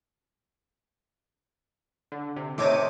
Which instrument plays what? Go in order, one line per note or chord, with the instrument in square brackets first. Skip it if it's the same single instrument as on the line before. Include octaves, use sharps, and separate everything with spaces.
[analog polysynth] D3
C3
[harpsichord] D2 C3 D#5 [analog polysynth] D#3 D6 D#7 [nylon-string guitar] A4 C#5